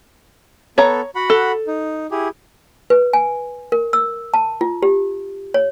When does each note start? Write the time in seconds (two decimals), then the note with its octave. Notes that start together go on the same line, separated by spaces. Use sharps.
0.78 B3 A4 C#5 A#5
1.15 F#4 F#5 B5
1.30 A4
1.67 D#4
2.11 E4 G4 G#4
2.90 B4
3.13 G#5
3.72 A#4
3.93 E6
4.34 A5
4.61 F4
4.83 G4
5.54 C#5